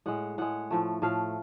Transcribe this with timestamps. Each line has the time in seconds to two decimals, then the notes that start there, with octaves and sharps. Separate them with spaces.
0.06 A2 G#3 F#5
0.38 A2 G#3 F#5
0.71 A2 F3 A3
1.02 A2 F3 A3 F5